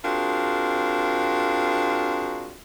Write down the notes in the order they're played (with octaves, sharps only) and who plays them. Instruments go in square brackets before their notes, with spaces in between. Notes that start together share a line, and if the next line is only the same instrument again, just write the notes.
[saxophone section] C4 D4 F4 F#4 G#4 A#4